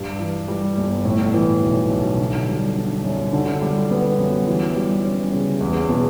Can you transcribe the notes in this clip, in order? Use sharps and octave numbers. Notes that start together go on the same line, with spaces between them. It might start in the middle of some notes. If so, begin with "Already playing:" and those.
Already playing: G2
E3
G3
G1
A2
E3
B1
B1
D3
G3
D4
F#2
D3
G3
B3
F#2
E3
G3
C#4
C#3
E2
B2